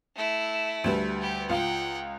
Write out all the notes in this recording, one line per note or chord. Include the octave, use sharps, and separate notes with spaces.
A3 E4
D2 G3 B4
G4
C#2 F4 F#5 G5